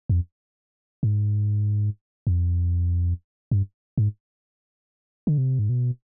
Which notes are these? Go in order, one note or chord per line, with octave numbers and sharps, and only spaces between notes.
F2
G#2
F2
G2
G#2
D3
C3
G#2
B2